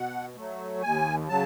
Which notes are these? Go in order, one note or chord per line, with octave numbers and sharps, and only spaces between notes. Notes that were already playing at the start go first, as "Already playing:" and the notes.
Already playing: B2 F#5
F#3 A3
D#2 G#5
C#3 F#3 A5